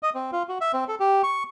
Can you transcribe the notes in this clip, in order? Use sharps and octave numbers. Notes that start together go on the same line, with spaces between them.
D#5
C4
F4
F#4
E5
C4
A4
G4
C#6